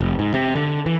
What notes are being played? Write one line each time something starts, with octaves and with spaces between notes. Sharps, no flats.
F1
G#2
C3
D3
E3